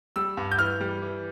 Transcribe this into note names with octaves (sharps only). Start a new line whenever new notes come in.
G3 E6
G2
G6
E3 F6
G3
E3